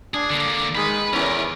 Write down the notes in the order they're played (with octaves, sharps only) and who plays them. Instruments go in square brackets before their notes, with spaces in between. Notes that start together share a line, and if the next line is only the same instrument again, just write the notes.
[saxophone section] D4 [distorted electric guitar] G#4
[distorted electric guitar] D3 A#3
[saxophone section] D#3 G#3 [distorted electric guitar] B4 B5
[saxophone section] E2 E3 C#4 [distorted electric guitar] A#4 B4